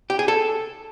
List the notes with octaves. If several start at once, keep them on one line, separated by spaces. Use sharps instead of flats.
G4
G#4
A4